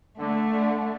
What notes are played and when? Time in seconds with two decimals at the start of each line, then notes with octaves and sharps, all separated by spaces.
0.18 D3 A3
0.51 D3